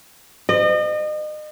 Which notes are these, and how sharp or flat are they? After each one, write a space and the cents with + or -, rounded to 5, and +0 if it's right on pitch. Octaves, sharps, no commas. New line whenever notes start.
D#5 -35